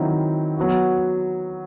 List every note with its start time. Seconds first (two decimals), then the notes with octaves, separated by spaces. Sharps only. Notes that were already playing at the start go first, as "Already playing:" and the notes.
Already playing: D#3 F#3 C4 E4
0.57 F#3 B3 F#4